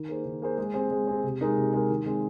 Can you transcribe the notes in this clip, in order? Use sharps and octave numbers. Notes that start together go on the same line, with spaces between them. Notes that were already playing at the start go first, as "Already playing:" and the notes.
Already playing: D#3
A#3 G#4 C5
D#3
A#3 G#4 C5
G#3
C4 G#4 C5
G#3
C4 G#4 C5
C3
G#3 D#4 A#4
C3
G#3 D#4 A#4
D#3
G#3 C4